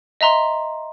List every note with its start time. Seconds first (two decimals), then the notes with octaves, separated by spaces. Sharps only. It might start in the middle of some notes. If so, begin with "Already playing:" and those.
0.21 D#5 E5 A#5 C6